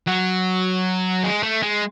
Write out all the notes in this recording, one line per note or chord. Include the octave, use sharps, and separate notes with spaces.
F#3
G#3
A3
G#3